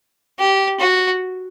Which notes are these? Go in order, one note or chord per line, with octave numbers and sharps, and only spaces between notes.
G4
F#4